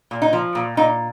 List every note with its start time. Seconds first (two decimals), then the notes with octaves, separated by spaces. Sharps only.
0.11 A#2
0.22 D#4
0.33 F3
0.55 A#2
0.77 A#2 D#4